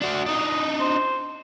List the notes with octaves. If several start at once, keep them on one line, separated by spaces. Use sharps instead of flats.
D4 F#4
D4 D#4 D#5
C5